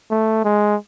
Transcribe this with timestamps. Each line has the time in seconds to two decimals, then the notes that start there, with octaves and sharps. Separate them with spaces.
0.11 A3
0.44 G#3